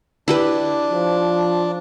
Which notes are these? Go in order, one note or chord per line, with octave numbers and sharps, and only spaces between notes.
D4 E4 G4 B4
F3